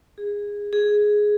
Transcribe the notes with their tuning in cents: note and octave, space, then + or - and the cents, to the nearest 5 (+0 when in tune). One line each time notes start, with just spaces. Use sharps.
G#4 -20
G#4 +5